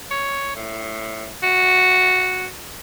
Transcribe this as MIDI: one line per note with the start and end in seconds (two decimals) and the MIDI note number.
0.11 0.55 73
0.56 1.30 45
1.43 2.47 66